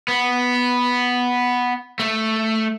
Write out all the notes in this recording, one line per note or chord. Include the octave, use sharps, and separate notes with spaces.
B3
A3